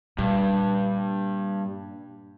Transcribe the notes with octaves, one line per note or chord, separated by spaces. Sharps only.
G2 A#2